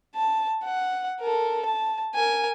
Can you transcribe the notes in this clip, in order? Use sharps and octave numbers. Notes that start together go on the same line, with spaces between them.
A5
F#5
A4 A#4
A5
A#4 G#5